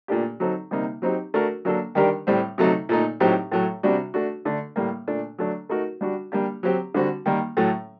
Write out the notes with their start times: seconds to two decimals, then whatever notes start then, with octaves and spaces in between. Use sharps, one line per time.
0.08 A#2 A3 D4 G4
0.40 F#3 C4 D#4 A4
0.71 C3 G3 A#3 D#4
1.02 F#3 C4 D#4 G4
1.34 A3 D4 F#4 A#4
1.65 F#3 A#3 D4 A4
1.95 D#3 G3 D4 G4 A#4
2.27 A2 G3 C4
2.58 C3 F#3 A3 D#4
2.89 A#2 A3 D#4
3.20 A2 F#3 C4 D#4 G4
3.52 A2 F#3 A3
3.83 C3 G3 D4 F#4
4.14 A3 D4 F#4
4.45 D3 A3 D4
4.76 A2 G3 A#3
5.07 A#2 A3 D4
5.38 F#3 A3 D4
5.69 A3 D#4 F#4 A#4
6.01 G3 D4 F#4
6.32 G3 A#3 D4 G4
6.63 F#3 C4 G4
6.94 D3 G3 C4 F#4
7.26 D#3 G3 A#3
7.57 A2 F#3 A3